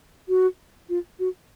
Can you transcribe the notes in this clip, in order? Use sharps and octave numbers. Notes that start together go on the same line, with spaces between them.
F#4
F4
F#4